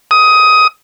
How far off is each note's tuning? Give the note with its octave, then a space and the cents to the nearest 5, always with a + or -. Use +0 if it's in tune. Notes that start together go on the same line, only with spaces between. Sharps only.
D#6 +15